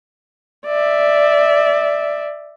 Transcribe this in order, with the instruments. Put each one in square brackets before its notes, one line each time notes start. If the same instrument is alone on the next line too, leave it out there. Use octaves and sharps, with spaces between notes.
[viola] D5 E5